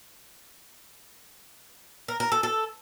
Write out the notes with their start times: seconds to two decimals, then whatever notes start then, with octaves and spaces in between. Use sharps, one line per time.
2.08 A#4
2.20 A#4
2.32 A4
2.43 A4